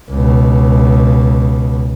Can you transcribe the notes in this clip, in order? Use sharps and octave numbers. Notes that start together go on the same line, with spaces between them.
C#2 B2